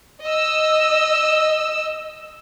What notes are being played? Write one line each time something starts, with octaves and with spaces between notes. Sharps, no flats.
D#5 E6